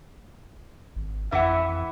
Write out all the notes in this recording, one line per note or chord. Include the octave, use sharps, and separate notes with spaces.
G#1
F2 E3 E4 E5 F#5